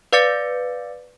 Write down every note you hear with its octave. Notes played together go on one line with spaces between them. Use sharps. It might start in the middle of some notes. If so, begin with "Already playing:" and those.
B4 D5 F5 D6 A6 C#7